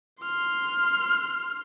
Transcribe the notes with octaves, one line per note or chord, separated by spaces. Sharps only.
C6 F6